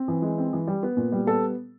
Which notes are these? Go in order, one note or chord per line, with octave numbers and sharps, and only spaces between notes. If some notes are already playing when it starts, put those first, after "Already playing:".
Already playing: C4
E3
G#3
C4
E3
G3
B3
A#2
G3
B3 A4